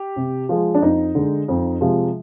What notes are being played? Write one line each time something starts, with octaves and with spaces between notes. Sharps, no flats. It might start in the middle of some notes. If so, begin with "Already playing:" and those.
Already playing: G4
C3
F3 G#3
D4
F2 D#4
D3 G#3
F2
C3 F3 G#3